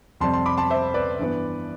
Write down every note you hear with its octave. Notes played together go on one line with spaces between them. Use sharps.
F2 C3 G3 C4 A5 C6
A5 C6
B5 D6
A5 C6
C5 E5
B4 D5
G2 E3 B3